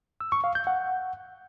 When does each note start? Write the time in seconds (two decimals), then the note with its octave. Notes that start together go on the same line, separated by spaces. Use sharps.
0.21 E6
0.32 C#6
0.44 F5
0.55 G6
0.67 F#5